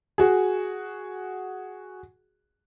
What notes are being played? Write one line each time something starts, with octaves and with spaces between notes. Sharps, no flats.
F#4 G#4